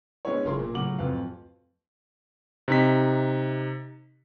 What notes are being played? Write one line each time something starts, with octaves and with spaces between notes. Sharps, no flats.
G#3 B3 C#4 D4 E4 C#5
F#1 F4 G#4 A#4 C6
A#2
A2 C#3 F#3 F#4 D6 F#7
D1 F2 F3 B4 F5
C3 D#4 B6